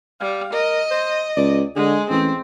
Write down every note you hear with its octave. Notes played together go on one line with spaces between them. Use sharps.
G3 F5
A#4 D#5
C5
C#2 D5
D3 G#3 G#4
A1 C4